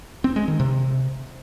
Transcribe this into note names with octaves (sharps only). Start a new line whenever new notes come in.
C4
G#3
D#3
C3